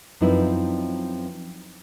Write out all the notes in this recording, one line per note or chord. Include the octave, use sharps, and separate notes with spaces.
F#2 F3 C4 D#4 E4 B4